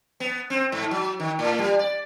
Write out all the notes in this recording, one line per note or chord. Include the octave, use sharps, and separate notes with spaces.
B3
C4
G#2
F#3
D#3
A2
G3
D5